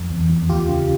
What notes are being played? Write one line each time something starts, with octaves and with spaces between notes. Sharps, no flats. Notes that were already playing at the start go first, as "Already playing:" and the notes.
Already playing: F2
E2
E2
D2 F4 G4
C#3